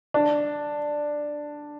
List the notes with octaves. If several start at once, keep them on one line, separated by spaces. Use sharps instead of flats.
D4